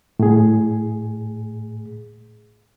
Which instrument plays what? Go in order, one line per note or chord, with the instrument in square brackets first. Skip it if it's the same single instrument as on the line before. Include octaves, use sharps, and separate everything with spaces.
[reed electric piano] A2 G#4